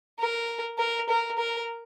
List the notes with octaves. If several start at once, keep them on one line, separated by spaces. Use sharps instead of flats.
A#4
A#4
A#4
A#4